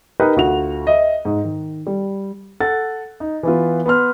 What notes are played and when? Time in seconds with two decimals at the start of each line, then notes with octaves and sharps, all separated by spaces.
0.20 D#4 G4 A#4 B4 D#5 G5
0.36 D2 F4 F#4 F#5 F7
0.87 D#5 E5
1.25 G#2
1.44 D#3
1.87 G3
2.60 A4 F#5 A6
3.20 D#4
3.43 E3 B3 F4
3.86 B3 B4 C6 F6